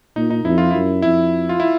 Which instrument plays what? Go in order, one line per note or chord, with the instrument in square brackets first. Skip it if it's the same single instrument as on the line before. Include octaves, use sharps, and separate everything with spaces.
[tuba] A#2 [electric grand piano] D#4
[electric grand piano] D#4
[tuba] F2 [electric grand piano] E4
[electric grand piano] F4
[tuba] F#2 [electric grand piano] E4
[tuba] F2 [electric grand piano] E4
[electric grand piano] F4
E4